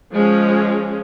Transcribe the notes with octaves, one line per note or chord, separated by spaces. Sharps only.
F3 G#3 C#4